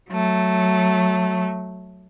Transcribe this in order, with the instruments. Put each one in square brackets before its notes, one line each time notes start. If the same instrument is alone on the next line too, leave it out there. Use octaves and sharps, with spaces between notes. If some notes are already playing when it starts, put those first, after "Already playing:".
[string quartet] F#3 A3